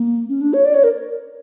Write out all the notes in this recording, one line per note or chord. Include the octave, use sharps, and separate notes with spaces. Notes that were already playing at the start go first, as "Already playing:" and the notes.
Already playing: A#3
C#4
D4
C#5
D5
C#5
A#4